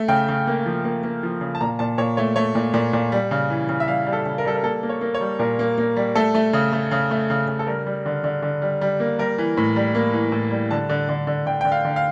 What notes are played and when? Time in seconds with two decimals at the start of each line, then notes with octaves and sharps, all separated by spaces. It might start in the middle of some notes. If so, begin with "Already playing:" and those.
Already playing: A3
0.08 C#3 G5
0.28 C#3
0.47 A#3
0.66 F3
0.84 A#3
1.03 A#3
1.23 F3
1.41 C#3
1.55 A5
1.61 A#2 A#5
1.79 A#2 A5
1.98 A#2 C#5
2.17 A3 C#5
2.36 A3 C#5
2.55 A#2
2.74 A#2
2.93 A#2
3.12 G3
3.31 C#3
3.50 E3
3.69 C#3
3.80 E5
3.88 G3 F5
4.07 G3
4.13 A4
4.26 C#3
4.38 A#4
4.45 G3 A4
4.56 A#4
4.63 A#3 A4
4.83 A#3
4.89 C#5
5.01 A#3
5.15 C#5
5.21 G3
5.39 A#2 A#4
5.59 A#3
5.78 A#3
5.97 G3
6.15 A3 A4
6.35 A3
6.53 C#3
6.73 A3
6.91 C#3
7.11 A3
7.30 C#3
7.48 C#3
7.59 A4
7.67 G3 A#4
7.86 G3
8.06 D3
8.24 D3
8.42 D3
8.62 G3
8.81 G3
9.00 A#3
9.19 G3 A#4
9.38 E3
9.57 A2
9.76 G3
9.95 A#3
10.13 E3
10.32 A2
10.51 G3
10.71 D3 A5
10.89 D3
11.09 D3
11.27 D3
11.46 D3 G5
11.61 D3 G5
11.72 F5
11.85 D3
11.96 F5